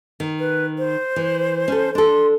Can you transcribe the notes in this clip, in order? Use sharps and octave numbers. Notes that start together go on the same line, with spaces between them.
D#3
B4
C5
E3
C#4 A4
D4 A4 C6